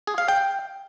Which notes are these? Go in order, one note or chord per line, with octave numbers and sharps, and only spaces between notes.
G#4
F5
G5